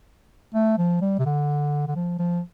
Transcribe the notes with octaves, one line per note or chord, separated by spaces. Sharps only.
A3
F3
G3
C3
D3
D3
F3
F3